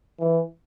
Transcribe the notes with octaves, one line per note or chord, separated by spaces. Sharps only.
E3